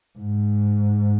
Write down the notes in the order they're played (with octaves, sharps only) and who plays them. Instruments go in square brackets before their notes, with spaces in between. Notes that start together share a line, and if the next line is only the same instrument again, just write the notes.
[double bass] G#2